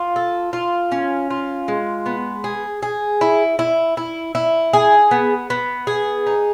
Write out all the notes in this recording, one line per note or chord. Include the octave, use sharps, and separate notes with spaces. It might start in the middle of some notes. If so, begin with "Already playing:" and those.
Already playing: F4
A4
F4
C#4
F4
G#3
B3
G#4
G#4
E4
E4
E4
E4
G#4
B3
B3
G#4
D#4